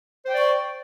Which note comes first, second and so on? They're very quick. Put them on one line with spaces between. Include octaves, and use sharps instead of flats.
C5 G5 D5 C#6